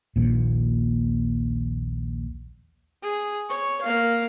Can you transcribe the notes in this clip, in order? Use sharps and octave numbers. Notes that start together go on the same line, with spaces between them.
A#1 D#2 A#2
G#4
C#5 C#6
A#3 F5